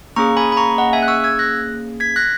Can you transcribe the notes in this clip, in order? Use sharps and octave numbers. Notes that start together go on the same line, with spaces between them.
A#3 C#4 G#4 A#5 C#6
G#5 B5
B5
A#5 C#6
D#5 F#5
E5 G#5
F#6
C#6 E6
E6 G#6
F#6 A#6
G#6 B6
F#6 A#6